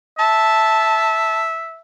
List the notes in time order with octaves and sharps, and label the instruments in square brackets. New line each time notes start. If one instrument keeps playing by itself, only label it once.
[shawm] E5 [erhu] A5